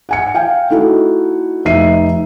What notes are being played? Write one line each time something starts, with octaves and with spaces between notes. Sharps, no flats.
F#5 G#5 C#7
F5 G5 G#5
A3 D#4 E4 F#4 A4
F1 D#4 E5 C7 D#7